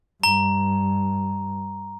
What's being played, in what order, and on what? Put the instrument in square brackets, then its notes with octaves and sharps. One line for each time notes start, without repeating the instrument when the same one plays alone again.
[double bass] G2 [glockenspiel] A#5